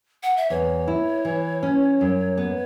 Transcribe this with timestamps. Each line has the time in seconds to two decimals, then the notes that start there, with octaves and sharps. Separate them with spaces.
0.23 F#5
0.37 E5
0.50 E2 C#5
0.88 E4
1.25 E3
1.63 C#4
2.01 F#2
2.37 B3